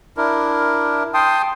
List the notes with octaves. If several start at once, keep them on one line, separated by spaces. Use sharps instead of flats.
D4 E4 A#4
G5 A5 C6 D#6